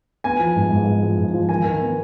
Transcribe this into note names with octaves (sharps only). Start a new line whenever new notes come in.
B3 G#5
F3
G#2
G#2
G#2
F3
G#2
F3
D#3 G#5
D#3
B3